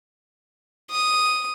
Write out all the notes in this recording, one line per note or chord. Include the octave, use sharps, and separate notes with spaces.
D#6